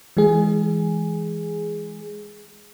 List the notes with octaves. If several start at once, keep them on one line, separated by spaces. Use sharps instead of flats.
E3 G#3 G#4